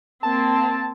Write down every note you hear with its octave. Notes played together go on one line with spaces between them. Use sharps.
A#3 C4 A5